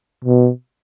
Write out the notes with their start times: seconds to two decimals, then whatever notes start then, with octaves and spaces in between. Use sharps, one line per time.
0.24 B2